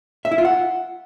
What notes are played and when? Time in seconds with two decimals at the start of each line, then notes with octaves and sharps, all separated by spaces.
0.25 E5
0.32 E4
0.38 F4
0.45 F#5